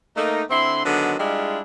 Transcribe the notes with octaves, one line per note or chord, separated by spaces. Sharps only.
A3 A#3 D#4
D3 C4 E4 C6
D3 D#3 F#3 G#3 B3
G3 G#3 D4 E4 F4